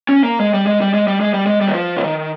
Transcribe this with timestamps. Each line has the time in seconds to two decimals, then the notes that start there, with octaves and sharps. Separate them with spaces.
0.09 C#4
0.24 A#3
0.39 G#3
0.54 G3
0.67 G#3
0.81 G3
0.94 G#3
1.07 G3
1.21 G#3
1.34 G3
1.46 G#3
1.61 G3
1.67 D#3
1.74 F3
1.96 C#3
2.04 D#3